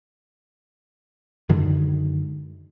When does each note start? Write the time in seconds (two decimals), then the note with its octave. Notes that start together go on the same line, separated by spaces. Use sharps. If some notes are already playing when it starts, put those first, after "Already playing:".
1.49 F#2 D3 D#3 G#3